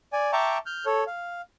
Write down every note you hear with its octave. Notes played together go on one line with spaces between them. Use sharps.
D5 G#5
E5 G5 A5 A#5 C#6 D6
F6 G6
A4 C#5
F5